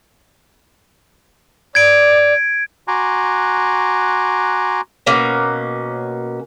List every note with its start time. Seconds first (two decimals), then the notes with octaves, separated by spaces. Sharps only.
1.75 D5 G#6 D7
2.88 F#4 G#5 A#5 C6 D6 F#6
5.06 B2 A#3 C#4